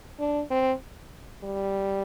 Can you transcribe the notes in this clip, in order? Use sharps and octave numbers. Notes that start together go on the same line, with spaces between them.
D4
C4
G3